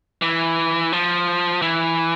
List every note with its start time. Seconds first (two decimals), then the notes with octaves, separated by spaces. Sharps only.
0.22 E3
0.92 F3
1.62 E3